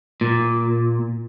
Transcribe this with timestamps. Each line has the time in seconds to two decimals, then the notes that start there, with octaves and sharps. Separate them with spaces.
0.21 A#2